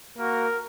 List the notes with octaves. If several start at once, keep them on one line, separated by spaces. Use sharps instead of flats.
A#3 F#4 A#4